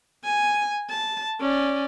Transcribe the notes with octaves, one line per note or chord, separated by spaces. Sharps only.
G#5
A5
C#4 D5